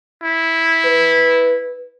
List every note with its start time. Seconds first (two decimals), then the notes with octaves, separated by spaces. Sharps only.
0.23 E4
0.85 B4